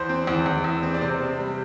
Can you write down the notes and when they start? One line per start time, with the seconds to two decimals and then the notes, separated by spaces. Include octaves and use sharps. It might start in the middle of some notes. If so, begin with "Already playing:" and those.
Already playing: E2 C5
0.09 C4
0.27 E2
0.46 E2
0.64 E2
0.83 C4
0.94 D5
1.01 C3 C5
1.21 C4
1.39 G3